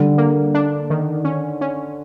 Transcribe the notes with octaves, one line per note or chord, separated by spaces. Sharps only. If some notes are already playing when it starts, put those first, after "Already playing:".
Already playing: D3 G3
A#3
D4
D#3
C#4
C#4